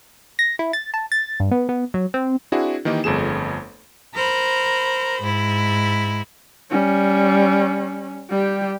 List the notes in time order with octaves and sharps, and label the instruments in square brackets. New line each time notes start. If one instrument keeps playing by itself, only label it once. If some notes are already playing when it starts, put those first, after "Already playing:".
[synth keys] A#6
E4
A6
A5
A6
G2
B3
B3
F#3
C4
[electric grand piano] C4 D4 E4 F#4 G#4
D#3 E3 A#3 D#4 G4
G1 F2 A3 G#4 E7
[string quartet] A#4 C5 B5
G#2 E4
[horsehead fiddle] G3 C#4
G3 G4